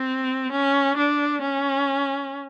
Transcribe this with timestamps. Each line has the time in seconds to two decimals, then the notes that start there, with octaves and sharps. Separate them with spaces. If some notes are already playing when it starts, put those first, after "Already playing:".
Already playing: C4
0.52 C#4
0.97 D4
1.42 C#4